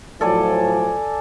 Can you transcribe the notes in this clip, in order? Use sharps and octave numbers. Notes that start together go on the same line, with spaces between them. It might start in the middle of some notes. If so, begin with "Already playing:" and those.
A2 F3 F#3 A4 D5 G#5